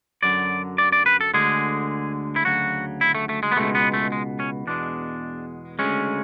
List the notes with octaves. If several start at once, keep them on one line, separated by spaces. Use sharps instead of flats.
F#2 D3 F#3 D5
D5
D5
B4
A4
D2 D3 G#3 G#4
E4
D2 C#3 F#3 F#4
E4
A3
A3
G#3
B3
C#2 B2 G#3 A3
B3
A3
G#3
C#4
E2 B2 G#3 D4
D2 C#3 G#3 C#4